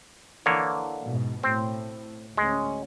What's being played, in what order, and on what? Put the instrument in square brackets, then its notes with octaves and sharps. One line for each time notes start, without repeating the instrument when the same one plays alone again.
[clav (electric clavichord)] D3 A#3 C#5 [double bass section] E3
[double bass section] G#2 B2
[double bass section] A2 [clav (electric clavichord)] C4
[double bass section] D2 C#4 [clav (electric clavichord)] G#3